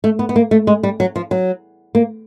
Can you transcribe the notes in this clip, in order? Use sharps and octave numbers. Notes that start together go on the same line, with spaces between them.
A3
B3
B3
A#3
A3
G#3
G3
F#3
F3
F#3
A#3